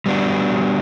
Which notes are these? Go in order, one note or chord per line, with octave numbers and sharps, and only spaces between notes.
G3 B3 D4 F#4